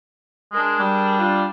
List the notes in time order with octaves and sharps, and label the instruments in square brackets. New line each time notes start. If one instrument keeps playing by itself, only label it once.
[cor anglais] G#3 [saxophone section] D4 G#4 A#4
[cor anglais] G3
[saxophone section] D4 F4